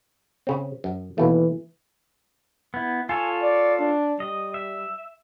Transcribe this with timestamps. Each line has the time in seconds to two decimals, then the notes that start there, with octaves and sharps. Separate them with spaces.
0.47 C#3 C4
0.84 F#2
1.18 D#2 B2 E3 A3
2.74 B3 E4
3.09 F4 A4 C#5 G#5
3.42 D5
3.79 D4
4.20 G3 D#5
4.54 E5